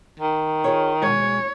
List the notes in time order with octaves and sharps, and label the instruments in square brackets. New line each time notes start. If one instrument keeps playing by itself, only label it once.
[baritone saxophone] D#3
[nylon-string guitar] F4 G#4 C#5
[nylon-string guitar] B2 G#3 [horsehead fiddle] C#5